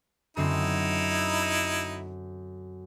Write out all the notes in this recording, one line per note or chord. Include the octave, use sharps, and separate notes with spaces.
F#2 D3 C4 D#4 E4